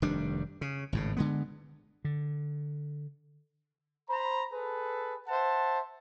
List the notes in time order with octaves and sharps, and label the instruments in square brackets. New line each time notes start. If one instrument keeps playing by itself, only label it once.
[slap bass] F1 D#3 G3 D4
C#3
G#1 A2 C#3
D3 G#3 B3
D3
[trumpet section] C5 A#5 B5
G#4 A4 B4
C5 E5 F#5 A5